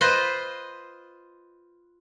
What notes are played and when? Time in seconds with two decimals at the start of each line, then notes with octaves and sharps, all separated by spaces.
0.01 F4 B4 C5 D#5